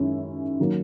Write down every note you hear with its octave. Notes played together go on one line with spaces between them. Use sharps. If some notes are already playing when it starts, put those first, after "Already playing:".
Already playing: F#2 D#3 G#3 C#4 E4
D#3 F#3 A#3 D#4